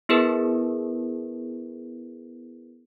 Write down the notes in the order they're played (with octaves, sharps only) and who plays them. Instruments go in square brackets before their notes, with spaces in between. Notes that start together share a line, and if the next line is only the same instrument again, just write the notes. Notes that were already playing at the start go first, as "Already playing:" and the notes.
[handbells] B3 E4 G#4 A#4 B4